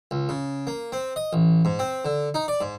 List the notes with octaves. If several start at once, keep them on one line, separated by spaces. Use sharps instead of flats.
C#2
C#3
A#3
C4
D#5
A1
G#2
C4
D3
D#4
D5
G#2